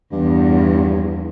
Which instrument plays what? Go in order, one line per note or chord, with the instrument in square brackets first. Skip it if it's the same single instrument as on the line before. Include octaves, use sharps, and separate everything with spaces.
[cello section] E2 [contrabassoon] G2